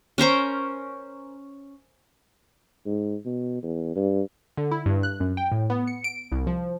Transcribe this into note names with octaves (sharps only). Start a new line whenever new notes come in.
C#4 A#4 C5 A#5
G#2
B2
E2
G2
D3
E4
G2
F#6
F#2
G5
A2
B3
C#7
D7
C2
F3